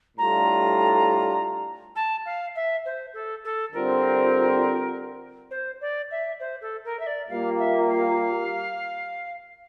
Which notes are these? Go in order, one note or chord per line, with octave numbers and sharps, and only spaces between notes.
A2 G3 D4 F4 A4 A#5
A5
F5
E5
C5
A4
A4
D3 G3 C4 F4 A#4
C5
D5
E5
C5
A4
A#4
E5
D5
A#2 G3 A#3 F4 F5
E5
F5